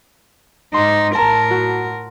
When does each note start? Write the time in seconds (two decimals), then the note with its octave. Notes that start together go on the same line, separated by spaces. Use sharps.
0.74 G#2 D#4 C6 D6
1.15 A2 A#4 A5 A#5
1.51 F#4